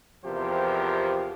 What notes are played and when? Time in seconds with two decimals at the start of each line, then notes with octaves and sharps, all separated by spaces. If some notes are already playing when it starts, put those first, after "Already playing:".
0.25 E2 C3 F3 G4 A#4 C5